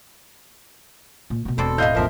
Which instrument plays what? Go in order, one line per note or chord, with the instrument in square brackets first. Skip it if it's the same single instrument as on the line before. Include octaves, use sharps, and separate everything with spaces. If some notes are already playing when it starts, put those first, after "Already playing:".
[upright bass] A#2
B2 A#3
[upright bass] E1 [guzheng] B2 C4 D5 [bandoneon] A4
[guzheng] A2 A3 [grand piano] D#5 F5 G6
[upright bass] E1 A1 [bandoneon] F3 A#4 [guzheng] A#3 E5